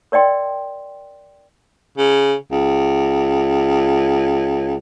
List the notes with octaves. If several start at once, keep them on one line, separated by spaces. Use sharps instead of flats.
A#4 D5 D#5 G5 C6
C#3
C#2